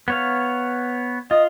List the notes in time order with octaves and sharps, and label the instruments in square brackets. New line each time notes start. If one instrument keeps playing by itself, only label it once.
[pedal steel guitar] B3 C#5 F5
[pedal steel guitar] F4 [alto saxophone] D#5